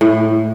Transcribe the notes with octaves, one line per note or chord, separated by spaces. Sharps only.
A2